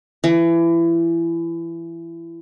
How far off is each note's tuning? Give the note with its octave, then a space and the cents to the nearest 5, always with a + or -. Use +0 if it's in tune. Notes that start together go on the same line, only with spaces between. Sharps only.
E3 +25